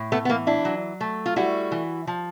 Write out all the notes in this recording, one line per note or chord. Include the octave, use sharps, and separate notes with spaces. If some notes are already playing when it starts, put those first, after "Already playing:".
Already playing: A2
A3 B3
B3
E3 A#3
D4 E4
F#3
A3
F4
G3 E4 F#4
E3
F3